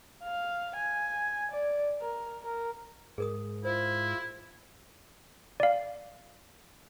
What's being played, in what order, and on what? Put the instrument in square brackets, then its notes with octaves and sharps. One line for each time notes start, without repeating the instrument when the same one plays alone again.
[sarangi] F5
G#5
D5
A#4
A#4
[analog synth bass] G#2 [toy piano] G#4 A#4 D#6
[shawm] E4 [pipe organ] F4 [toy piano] C5
[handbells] D5 F5